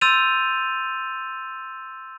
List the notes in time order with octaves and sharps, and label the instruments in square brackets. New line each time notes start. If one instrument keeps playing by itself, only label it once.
[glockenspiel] C6 E6 G6 A6 D#7 F7